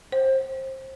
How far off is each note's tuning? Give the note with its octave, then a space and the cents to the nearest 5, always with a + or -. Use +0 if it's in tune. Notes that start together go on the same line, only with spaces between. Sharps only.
C5 +25